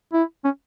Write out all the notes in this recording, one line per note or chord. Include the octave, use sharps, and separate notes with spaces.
E4
C#4